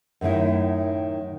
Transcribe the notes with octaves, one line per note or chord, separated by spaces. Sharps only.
F#2 A2 D#3 E4